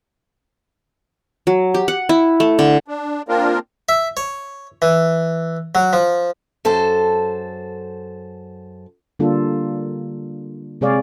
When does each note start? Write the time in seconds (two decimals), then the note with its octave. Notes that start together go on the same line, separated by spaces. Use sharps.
1.47 F#3
1.74 G4
1.88 F#5
2.09 E4
2.40 A3
2.59 D3
2.88 D4
3.28 A#3 C4 D4 F4 A#4
3.89 E5
4.17 C#5
4.82 E3
5.75 F#3
5.93 F3
6.65 F#2 A4 C5 A5
9.19 D3 G3 A#3 D4 F4 A4
10.81 C3 G#3 G#4 C#5 D5 F5